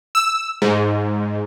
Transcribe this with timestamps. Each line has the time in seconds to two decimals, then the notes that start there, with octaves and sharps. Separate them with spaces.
0.15 E6
0.62 G#2